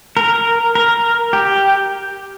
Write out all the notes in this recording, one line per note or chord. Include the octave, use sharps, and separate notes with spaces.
A#4
A#4
G4